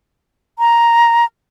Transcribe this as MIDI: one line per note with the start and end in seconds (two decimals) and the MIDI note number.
0.59 1.25 82